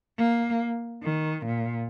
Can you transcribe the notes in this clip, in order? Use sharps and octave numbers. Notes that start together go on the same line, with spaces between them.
A#3
D#3
A#2